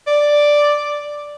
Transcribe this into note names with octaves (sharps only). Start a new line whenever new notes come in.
D5